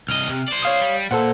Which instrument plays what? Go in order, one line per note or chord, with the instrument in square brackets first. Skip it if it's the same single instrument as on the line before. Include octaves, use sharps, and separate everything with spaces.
[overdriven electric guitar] C2 D#5 [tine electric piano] F6
[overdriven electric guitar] C3
C5 D5
[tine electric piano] C#5 F5 D#6
[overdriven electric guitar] G3
[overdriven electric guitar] A#2 [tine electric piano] A4 C5 F#5